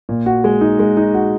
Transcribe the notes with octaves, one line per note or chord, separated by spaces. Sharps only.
A#2
F#4
G#3
D#4
G#3
D#4
F#4